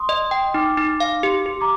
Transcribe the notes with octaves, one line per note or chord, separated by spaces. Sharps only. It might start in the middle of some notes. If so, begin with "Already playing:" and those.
Already playing: C6 D#6
D#5
G5
D#4 D6 F6
D#4
F5
G4
G4
A#5 D6